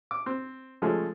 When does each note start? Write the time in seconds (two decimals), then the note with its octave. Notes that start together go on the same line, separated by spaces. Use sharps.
0.11 D6
0.26 C4
0.82 C#3 F3 G#3 A3